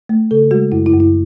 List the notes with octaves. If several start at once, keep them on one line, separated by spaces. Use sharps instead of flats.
A3
C#3 A4
G#3 F#4
F#2 E4
E4
F#2
E4